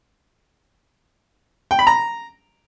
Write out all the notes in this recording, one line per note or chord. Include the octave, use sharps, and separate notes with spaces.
G5
B5
A#5